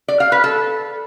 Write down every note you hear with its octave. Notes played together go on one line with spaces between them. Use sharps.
D5
F5
B4
A4